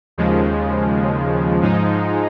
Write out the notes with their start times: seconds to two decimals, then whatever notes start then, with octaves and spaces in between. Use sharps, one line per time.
0.18 D#2 C#3 F3 G#3
1.62 G#2 F3 G#3 D#4